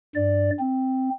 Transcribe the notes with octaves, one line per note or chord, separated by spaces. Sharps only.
G2 D5
C4